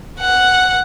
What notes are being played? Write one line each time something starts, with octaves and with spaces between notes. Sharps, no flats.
F#5